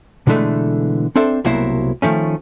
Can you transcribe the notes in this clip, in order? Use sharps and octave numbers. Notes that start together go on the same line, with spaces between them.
B2 D3 E3 G#3 A3
C4 D4 A4 C5 E5
C2 B2 F#3 A#3 E4 C5
D#3 F3 A3 C#4